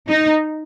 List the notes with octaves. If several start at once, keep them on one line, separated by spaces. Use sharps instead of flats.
D#4